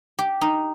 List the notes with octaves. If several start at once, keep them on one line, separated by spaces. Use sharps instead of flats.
G4
D#4